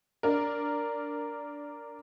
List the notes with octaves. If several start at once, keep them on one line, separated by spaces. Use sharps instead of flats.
D4 A#4